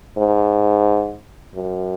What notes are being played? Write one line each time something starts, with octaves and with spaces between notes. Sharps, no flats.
G#2
F#2